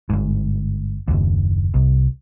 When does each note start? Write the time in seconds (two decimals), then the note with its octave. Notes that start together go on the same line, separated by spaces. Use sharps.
0.10 G1 G#2
1.08 F#1 D#2
1.74 C2